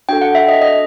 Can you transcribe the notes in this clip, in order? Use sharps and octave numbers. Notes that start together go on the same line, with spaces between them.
D4 F#4 A4 G5
F#5
E5
D#5
D#5